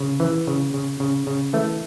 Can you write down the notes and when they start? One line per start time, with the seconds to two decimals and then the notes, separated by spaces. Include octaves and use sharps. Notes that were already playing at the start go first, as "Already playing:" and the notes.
Already playing: C#3
0.20 E3
0.47 C#3
0.74 C#3
1.00 C#3
1.27 C#3
1.53 E3 A3